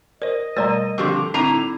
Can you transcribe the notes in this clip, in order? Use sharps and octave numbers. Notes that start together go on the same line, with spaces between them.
A#4 C5 D5 D#5
B2 G3 A3 A#4 D5 A#5
D3 F3 C4 G4 D6 E6
A2 D3 C4 D#4 E4 A#5